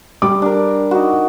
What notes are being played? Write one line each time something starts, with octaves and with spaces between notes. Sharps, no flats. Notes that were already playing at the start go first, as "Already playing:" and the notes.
G3 D6
D4 A#4
D#4 F#4